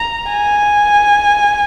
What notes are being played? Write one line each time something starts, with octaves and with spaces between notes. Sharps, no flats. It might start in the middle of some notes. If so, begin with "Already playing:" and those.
Already playing: A#5
G#5